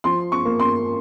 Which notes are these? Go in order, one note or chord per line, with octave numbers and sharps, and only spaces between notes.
F3 C6
C#6
A#3
C6